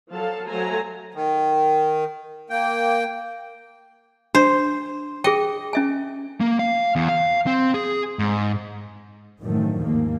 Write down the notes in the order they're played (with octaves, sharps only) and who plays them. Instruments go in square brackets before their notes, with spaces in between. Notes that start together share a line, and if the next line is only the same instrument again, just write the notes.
[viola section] F3 F#3 A4 F5 A5
F#3 A3 A4 C5 G#5 A#5
[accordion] D#3
A#3 G5
[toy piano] D4 [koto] C5
[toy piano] G#4 G5 [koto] D#5
[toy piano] C#4 E5 G#5
[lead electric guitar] A#3
F5
E2
F5
C4
G#4
G#2
[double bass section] F#2 A2 D3 D#3 F3 A3
D#2 G#2 A#3